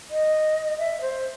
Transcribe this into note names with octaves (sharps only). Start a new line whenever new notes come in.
D#5
E5
C5